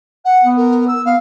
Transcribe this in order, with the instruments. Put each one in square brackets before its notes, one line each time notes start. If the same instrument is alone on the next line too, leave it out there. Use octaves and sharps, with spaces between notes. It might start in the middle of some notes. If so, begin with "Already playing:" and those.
[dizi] F#5
[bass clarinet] B3
[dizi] A#4
E6
[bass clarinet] B3 [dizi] F5